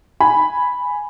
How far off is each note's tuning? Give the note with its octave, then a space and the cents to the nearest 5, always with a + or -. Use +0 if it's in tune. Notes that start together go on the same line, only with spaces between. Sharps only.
G#5 +0 B5 +0